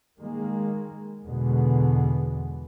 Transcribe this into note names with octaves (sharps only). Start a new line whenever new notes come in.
D#3 G#3 A#3
E2 B2 D3 G#3 B3